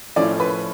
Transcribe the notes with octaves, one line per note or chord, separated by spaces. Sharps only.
A2 F3 A3 C#4 D5
B4